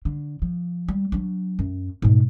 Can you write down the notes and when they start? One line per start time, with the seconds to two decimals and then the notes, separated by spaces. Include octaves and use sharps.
0.05 D3
0.42 F3
0.88 G3
1.12 F#3 D4
1.59 F#2
2.02 G#2 B2